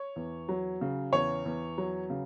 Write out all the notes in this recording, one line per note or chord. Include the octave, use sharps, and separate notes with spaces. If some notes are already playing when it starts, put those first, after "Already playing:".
Already playing: C#5
E2
F#3
C#3
E2 C#5
E2
F#3
C#3